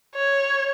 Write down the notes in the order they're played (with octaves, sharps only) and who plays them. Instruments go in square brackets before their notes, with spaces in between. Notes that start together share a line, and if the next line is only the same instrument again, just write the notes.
[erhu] C#5